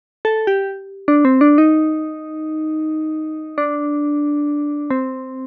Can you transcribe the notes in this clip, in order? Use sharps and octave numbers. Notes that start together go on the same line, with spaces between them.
A4
G4
D4
C4
D4
D#4
D4
C4